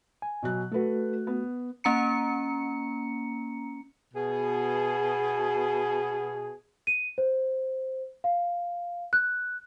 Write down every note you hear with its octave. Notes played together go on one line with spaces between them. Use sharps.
G#5
B2 F#3 F#6
A3 F#4 A4 B4
B3
A#3 C#4 A#5 C#7
B2 G#4
D#7
C5
F5
F#6